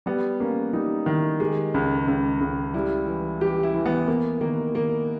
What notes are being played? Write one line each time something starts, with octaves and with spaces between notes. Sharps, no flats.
G3 B3
A#3 C#4
G3 D#4
D#3 E4
G#3 G4
C#2
C#2
C#2
G3 E4
E3
E3 G4
E4
E3
B3
A#3 B3
D#3 A#3
D#3 A#3